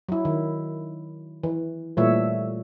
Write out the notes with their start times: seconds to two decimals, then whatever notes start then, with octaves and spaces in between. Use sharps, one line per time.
0.09 F#3 E4
0.25 D#3
1.43 E3
1.97 A#2 E3 G3 A3 C#5 E5